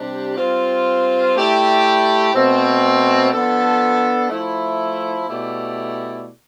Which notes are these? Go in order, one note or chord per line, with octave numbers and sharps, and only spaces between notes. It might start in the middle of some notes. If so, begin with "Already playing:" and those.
Already playing: C3 G3 D4 G4
G3 C4 F4
A3 E4 G4 D5
B2 A3 C4
F3 B3 D4 A4
F3 A3 E4
B2 A3 E4 G4 D5